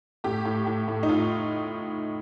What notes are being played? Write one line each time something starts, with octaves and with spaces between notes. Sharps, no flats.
A2 G4
A2
A2
A2
D#4
A2 F4